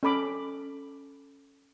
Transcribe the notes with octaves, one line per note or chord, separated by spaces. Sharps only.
C#4 A4 B5 D6